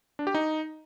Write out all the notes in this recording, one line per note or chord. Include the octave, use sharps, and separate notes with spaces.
D4
G4
D#4